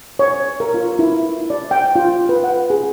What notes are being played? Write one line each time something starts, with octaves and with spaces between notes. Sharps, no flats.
C#5
A#4
F4
E4
D5
G5
F4
B4
F#5
G#4